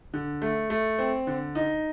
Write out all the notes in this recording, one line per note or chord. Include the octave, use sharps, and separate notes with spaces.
D3
A3
A3
C4
D3
D#4